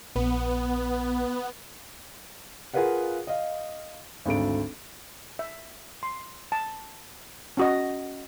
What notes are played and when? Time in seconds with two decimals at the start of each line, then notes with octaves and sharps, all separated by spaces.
0.16 A#1 B3
2.74 F4 G#4 A#4 B4 F5 F#5
3.27 D#5 F5
4.25 G#1 D2 A4 D7
5.39 E5
6.03 C6
6.52 A5
7.57 C#4 F#4 D#5